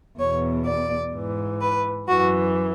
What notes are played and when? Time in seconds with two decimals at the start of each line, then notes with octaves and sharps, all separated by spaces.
0.19 E2 B2 C#5
0.67 D5
1.13 G#2 E3
1.61 B4
2.08 F#2 E3 F#4